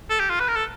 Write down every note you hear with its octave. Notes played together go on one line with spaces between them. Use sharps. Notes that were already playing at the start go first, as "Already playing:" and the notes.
A4
G4
F4
B4
A#4
A4